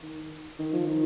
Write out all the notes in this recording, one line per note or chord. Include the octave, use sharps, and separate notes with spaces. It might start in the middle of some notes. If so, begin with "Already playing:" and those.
D#3
D#3
F3
D#3